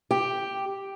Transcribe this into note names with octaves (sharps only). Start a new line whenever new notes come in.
G4